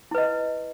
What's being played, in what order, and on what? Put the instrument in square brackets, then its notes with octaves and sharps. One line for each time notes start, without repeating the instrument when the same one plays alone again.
[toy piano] E4
B4
D#5